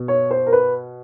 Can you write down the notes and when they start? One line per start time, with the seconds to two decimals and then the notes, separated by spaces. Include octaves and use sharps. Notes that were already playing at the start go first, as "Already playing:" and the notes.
Already playing: B2
0.08 C#5
0.31 C5
0.46 A#4
0.53 B4